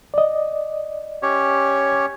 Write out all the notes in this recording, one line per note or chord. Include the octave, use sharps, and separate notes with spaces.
D5 D#5
C#4 G4 C#5